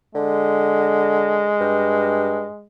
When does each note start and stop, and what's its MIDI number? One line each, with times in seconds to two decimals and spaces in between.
0.15 1.56 50
0.15 2.67 56
1.60 2.46 43